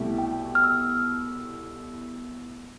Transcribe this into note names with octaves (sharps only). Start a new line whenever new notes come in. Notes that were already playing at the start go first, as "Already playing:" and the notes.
Already playing: C2 B2 A3 E4 G4
G5
F6
E6